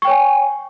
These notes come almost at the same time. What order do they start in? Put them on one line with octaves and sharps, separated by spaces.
C#6 G5 C#5 G#5